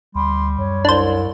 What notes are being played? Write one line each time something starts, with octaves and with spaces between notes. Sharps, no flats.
D2 G3 C6
F#2 C#5
C2 D4 C5